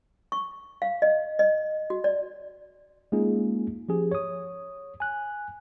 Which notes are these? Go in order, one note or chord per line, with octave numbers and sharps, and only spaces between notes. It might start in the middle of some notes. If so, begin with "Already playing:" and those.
C#6
F5
D#5
D#5
F#4
D5
G#3 A#3 C#4 D#4 F4 G#4
F3 C#4 G4 G#4
C#5 D#6
G#5 F#6